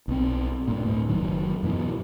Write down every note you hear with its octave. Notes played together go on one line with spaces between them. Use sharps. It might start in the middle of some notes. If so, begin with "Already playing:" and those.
B1 C4
G2 A#2
D2 A2
F#1 F#2 D#3 F#3
F#2 B2 D3 E3